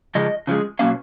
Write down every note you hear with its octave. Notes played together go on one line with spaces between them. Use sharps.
C#3 F3 G#3 D#5
C#3 F3 G#3
B2 F#3 A#3 C#4 F5